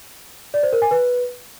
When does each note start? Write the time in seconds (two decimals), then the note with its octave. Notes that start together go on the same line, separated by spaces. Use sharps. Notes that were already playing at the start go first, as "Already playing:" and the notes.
0.54 D5
0.63 C5
0.72 A#4
0.82 G#5
0.91 B4